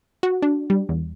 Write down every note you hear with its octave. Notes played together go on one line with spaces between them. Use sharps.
F#4
D4
G3
E2